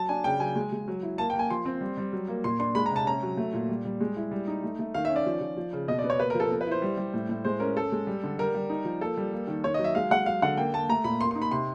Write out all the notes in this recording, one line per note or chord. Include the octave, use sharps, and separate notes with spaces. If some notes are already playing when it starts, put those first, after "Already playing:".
Already playing: F#3 A5
D4 G#5
C#3 G5
F#3 G#5
G#3
G#3
F#3
E4
A#3 A5
G5
A#3
G#5
F3 C6
C4
G3
G3
F#3
A#3
A#2 C6
D4 C6
G#3 B5
A#5
C3 A5
C#4 A#5
F#3
A3
A#2
G3
G3
G#3
E4
G3
D#4
A3
A3
D#3 F5
E5
C#4
D5
F3
F3
F3
C#3
B2 D#5
D5
B3
C#5
A#3 B4
A#4
F3
A4
B3 A#4
B4
E4 C5
G3
G3
A2
A2
G#3 C5
C#4 A#4
C#4 A4
G#3
G3
D3
G3 A#4
G3
D#4
F3
A#3 A4
G3
A#3
D#3
D#3 C#5
D#5
F#3
E5
G#3 F5
G#3 F#5
F#3 F5
D3 F#5
A#3 G5
A#3 A5
A3 A#5
A#2 B5
A#3 C6
C6
D#4
B5
C3 C6